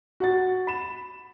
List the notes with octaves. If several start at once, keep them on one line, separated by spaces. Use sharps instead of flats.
F#4 F#5 A6
B5 E7